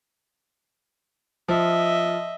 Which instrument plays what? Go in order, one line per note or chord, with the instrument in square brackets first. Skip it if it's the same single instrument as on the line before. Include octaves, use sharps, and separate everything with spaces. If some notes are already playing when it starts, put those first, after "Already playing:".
[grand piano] F3 [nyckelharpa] D#5 E5